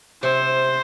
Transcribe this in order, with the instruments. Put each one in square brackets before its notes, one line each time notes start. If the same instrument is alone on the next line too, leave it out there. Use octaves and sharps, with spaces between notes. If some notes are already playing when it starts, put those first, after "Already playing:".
[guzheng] C3 [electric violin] C5